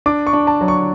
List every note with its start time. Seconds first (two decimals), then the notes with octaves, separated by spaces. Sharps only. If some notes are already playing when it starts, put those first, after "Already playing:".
0.06 D4 D6
0.27 C#6
0.33 D4
0.47 A5
0.61 F#3
0.68 C#6